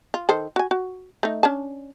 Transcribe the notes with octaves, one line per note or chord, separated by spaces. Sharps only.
F4
D#3 A4 C5
F#4 G#5
F#4
A3 D#4
C#4 D4 A5